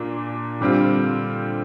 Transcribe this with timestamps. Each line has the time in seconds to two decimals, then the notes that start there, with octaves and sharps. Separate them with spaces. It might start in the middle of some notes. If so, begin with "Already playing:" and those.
Already playing: A#2 A#3 D4
0.61 D3 G3 C4 F4